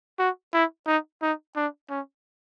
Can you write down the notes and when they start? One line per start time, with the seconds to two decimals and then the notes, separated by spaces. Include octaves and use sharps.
0.19 F#4
0.53 E4
0.87 D#4
1.22 D#4
1.56 D4
1.90 C#4